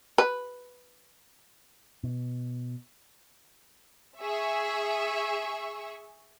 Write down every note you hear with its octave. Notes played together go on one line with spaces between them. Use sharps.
B4
B2
G#4 E5 C#6